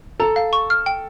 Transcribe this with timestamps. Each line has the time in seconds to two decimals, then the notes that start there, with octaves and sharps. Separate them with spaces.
0.20 A4 A#5
0.36 F5
0.53 C#6
0.70 F6
0.86 G5